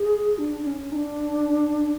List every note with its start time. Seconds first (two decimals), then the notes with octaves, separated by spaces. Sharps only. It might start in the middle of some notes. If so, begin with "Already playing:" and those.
Already playing: G#4
0.39 D4
0.62 D4
0.67 C#4
0.92 D#4
0.95 D4